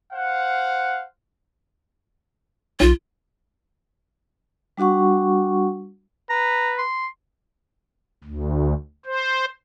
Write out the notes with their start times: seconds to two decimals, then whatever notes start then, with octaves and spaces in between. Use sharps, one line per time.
0.13 C5 F5 F#5
2.80 B1 F4
4.77 G3 D4 F#4 F#5 C#6
6.30 B4 A#5
6.78 C6
8.24 D2
9.06 C5